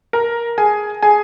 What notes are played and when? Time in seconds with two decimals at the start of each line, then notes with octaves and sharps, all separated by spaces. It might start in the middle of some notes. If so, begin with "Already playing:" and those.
0.13 A#4 A#5
0.58 G#4 G#5
1.03 G#4 G#5